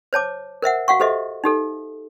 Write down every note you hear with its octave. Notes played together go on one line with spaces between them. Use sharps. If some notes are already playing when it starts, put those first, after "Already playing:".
C5 C#5 A5 D6
A#4 C5 E5 F#5
F#4 F5 F#5 C#6
G4 A4 C5 D#5 E5
D#4 G4 A4